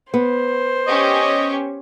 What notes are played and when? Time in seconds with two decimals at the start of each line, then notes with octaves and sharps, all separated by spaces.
0.14 B3 C5
0.87 C#4 G4 D#5 C#6